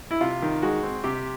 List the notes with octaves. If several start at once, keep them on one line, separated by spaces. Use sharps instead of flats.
E4
C3 F4
D#3
G#3 F#4
C4
C3 G4